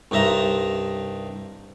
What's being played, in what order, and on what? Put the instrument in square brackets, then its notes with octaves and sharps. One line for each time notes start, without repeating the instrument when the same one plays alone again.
[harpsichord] C2 G2 D#4 E5 A#5